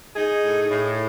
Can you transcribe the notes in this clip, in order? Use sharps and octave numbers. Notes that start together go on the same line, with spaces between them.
D#4 G#4
A2
A2